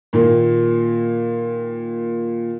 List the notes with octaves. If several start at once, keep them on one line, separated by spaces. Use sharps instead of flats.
A#2 D#3 A#3